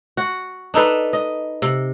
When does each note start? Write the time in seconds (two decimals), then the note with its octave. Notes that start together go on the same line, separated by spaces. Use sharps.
0.17 F#4
0.74 D4 D#4 A4 B4
1.13 D#5
1.62 C3